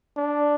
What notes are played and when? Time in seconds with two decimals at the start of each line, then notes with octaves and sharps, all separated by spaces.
0.17 D4